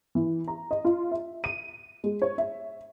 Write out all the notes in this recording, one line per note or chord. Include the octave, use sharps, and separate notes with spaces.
E3
A#5
D#5
F4
E5
D#7
G#3
C#5
E5